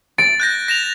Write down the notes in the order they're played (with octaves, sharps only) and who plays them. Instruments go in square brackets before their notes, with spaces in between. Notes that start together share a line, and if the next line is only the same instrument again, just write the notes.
[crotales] A6 [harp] D7
[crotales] F#6 G6 A#6
A#6 E7 F7